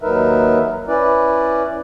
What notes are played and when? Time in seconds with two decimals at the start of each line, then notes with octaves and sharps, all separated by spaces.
0.02 D#2 F#3 D#4 A#4 B4 E5
0.88 C#4 E4 B4 D5